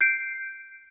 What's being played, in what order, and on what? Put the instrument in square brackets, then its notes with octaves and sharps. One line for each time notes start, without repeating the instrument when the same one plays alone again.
[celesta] G6 C7 D7